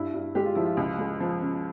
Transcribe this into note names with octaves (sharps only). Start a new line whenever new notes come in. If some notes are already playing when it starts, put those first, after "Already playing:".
Already playing: G2 E4
G2
G#3 G4
F4
F3 E4
F4
C#2
G#3
F3
C#3